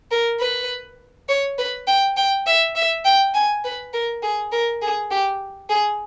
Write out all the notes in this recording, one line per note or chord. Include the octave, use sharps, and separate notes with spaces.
A#4
B4
C#5
B4
G5
G5
E5
E5
G5
G#5
B4
A#4
G#4
A#4
G#4
G4
G#4